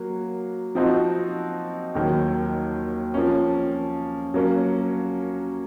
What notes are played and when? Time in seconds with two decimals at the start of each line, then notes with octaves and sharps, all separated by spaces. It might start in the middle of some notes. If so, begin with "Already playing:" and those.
Already playing: F#3 A#3
0.75 F3 C4 D#4 F#4
1.95 D#2 D#3 F#3
3.14 F3 A#3 C#4
4.34 F#3 A#3 C#4